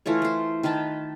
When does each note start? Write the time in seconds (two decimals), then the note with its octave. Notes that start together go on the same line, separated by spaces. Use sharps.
0.06 E3 A3 F4 C#5
0.22 A3 C5
0.63 D#3 B4 G5 A5